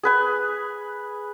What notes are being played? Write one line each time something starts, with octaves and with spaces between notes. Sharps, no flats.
G#4 B4 G#5